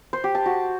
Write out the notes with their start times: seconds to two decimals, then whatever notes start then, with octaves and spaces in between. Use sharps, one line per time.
0.13 C5
0.24 G4
0.35 A5
0.46 F#4